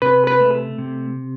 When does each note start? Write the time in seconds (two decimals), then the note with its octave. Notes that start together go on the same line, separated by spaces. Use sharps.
0.02 C3 B4
0.27 B4
0.40 A3
0.78 C3